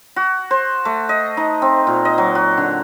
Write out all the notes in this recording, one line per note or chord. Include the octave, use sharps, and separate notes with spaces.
F#4
C5
A3
D#5
D#4
C4
A#2
D#5
F#3
F#4
D3